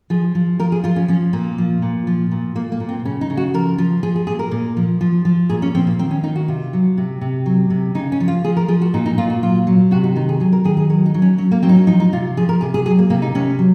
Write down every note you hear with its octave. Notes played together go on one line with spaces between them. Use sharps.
F3 G#4
F3
F3 A#4
G#4
F3 F4
C#4
F3 C#4
A#2 A#3
F3
A#2
F3
A#2
A#2 A#3
A#3
A#2
C4
C#3 C#4
D#4
C#3
F#4
F3 A#4
F3
F3 G#4
G#4
A#2 G#4
A#4
A#2
F3
F3
F3
A#2 G#4
C#4
F3 C4
A#3
D#3 C4
C#4
D#3 D#4
F#4
C3 F4
F#3
C3
C3
F#3
C3
C#3 D#4
C#4
F3
F4
F3 G#4
A#4
F3 G#4
F#4
A#2 D#4
D#4
A#2 F4
F#4
F#3 F4
F#3
C3 F#4
D#4
D#3 D#4
G#4
F#3 G#4
A#4
D#3 G#4
G#4
F#3 A#4
D#4
F#3
C#4
F#3 C#4
A#3
F#3 C4
D#4
C#4
F3 D#4
D#4
C3 F4
F3 G#4
A#4
C3 G#4
G#4
F#3 G#4
A#3
C3 A#3
D#4
C3 C#4
F#3